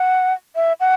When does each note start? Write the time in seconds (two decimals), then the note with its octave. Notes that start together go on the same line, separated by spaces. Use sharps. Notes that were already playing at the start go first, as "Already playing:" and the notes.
Already playing: F#5
0.56 E5
0.80 F#5